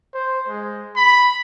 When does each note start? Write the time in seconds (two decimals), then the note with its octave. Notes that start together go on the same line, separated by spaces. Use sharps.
0.14 C5
0.48 G#3
0.96 B5